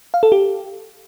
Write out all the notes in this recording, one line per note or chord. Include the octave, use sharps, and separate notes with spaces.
F5
A4
G4